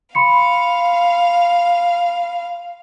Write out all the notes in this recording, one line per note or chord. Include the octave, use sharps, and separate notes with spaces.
F5 B5 C6 C#7